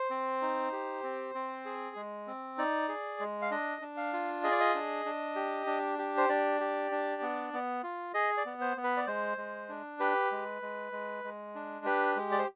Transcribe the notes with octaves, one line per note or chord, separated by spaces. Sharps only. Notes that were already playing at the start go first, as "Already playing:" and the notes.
Already playing: C5
C4
D#4
G4
C4
C4
G#4
G#3
C4
D#4 D5
G#4
G#3
F5
D4 D#5
D4
F5
F4
G#4 D#5
D5
D#5
D4
D4
G4
D4
G4
C5
D4 D5
G4
D4
B3
B3
F4
G#4 D#5
D5
B3
C5
B3
B4
D5
G#3 C5
G#3
D4
G4 B4
G#3
G#3
G#3
G#3
D4
G4 B4
G#3
D5
C5